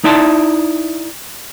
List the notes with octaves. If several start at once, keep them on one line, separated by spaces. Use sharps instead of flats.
D#4 E4 D5 E5 A5 C6